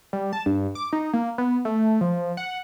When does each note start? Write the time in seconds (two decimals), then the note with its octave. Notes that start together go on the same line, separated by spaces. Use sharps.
0.13 G3
0.33 A5
0.46 G2
0.75 D6
0.93 D#4
1.13 A#3
1.38 B3
1.65 A3
2.01 F3
2.37 F#5